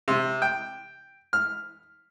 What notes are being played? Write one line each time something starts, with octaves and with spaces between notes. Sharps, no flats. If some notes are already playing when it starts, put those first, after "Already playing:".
C3
G5
F6